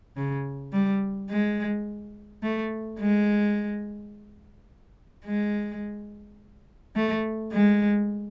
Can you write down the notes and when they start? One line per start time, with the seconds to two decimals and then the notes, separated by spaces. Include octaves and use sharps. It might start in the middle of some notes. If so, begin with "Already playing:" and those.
0.17 C#3
0.73 G3
1.29 G#3
2.43 A3
2.99 G#3
5.26 G#3
6.96 A3
7.52 G#3